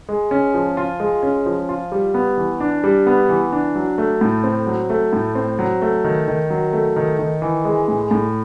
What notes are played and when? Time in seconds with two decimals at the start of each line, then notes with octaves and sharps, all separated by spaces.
0.09 G#3
0.31 C#4
0.54 F3
0.77 F4
1.00 G#3
1.23 C#4
1.46 F3
1.69 F4
1.92 G3
2.14 B3
2.37 E3
2.60 D4
2.84 G3
3.07 B3
3.29 E3
3.52 D4
3.76 F#3
3.98 A3
4.21 A2
4.44 C4
4.67 F#3
4.90 A3
5.13 A2
5.35 C4
5.59 F#3
5.82 A3
6.04 D#3
6.28 D#3
6.50 F#3
6.73 A3
6.96 D#3
7.19 D#3
7.42 E3
7.65 G#3
7.88 A2
8.11 A2